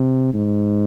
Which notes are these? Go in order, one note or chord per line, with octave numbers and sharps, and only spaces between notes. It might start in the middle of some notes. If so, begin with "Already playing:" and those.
Already playing: C3
G#2